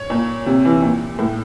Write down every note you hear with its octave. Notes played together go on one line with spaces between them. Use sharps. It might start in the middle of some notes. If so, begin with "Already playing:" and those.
Already playing: C#5
A#2
C3
E3
A#2
A2